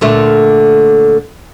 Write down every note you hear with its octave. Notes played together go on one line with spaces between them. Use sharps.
A#2 D3 A3